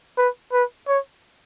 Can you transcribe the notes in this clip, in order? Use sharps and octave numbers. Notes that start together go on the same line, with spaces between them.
B4
B4
C#5